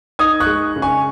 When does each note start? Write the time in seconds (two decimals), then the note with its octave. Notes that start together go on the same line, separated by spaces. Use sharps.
0.19 D#4 D#6 G#6
0.40 C#6 F#6
0.47 G#3
0.76 C#3
0.82 G#5 C#6